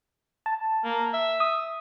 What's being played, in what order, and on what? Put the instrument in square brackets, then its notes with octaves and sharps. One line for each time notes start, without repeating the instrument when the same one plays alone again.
[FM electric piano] A5
[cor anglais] A#3
E5
[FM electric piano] D#6